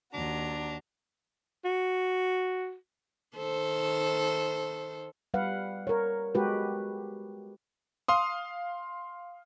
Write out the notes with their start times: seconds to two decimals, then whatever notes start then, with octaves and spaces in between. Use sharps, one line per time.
0.14 D#2 D4 F#4 A#5
1.65 F#4
3.37 D#3 A4 C5
5.34 G3 B4 F5 F#5
5.87 A#4 C#5
6.35 G#3 F#4 G4 B4
8.08 F5 C6 D#6